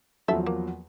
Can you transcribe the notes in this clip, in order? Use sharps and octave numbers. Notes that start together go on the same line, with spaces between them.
E2 F3 F#3 A4 E5
A#3